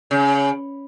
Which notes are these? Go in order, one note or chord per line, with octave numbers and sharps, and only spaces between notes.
C#3